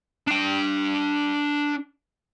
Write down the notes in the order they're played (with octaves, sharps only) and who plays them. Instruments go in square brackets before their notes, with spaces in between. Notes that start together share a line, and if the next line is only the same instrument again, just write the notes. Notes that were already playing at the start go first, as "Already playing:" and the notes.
[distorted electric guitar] D4 G5